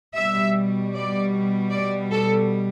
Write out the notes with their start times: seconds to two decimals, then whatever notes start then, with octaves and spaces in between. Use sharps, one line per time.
0.16 B2 G3 E5
0.95 D5
1.72 D5
2.12 A4